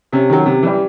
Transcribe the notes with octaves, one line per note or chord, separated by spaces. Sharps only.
C3 C#4
D#3 F#3
C3
E3 G3